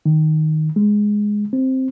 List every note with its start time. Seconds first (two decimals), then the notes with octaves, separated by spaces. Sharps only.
0.06 D#3
0.76 G#3
1.53 C4